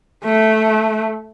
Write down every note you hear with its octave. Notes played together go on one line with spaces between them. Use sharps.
A3